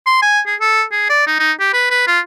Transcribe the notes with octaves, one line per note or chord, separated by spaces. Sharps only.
C6
G#5
G#4
A4
G#4
D5
D#4
D#4
G4
B4
B4
F4